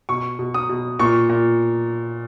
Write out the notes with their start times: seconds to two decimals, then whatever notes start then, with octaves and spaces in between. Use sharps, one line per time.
0.09 B2 C#6
0.39 B2
0.54 D#6
0.69 B2
0.99 A#2 C#6
1.30 A#2